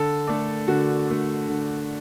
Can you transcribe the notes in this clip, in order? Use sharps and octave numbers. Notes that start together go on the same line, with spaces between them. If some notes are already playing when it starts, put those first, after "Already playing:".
Already playing: D3 A4
A3 D4
D3 F#4
A3 D4
D3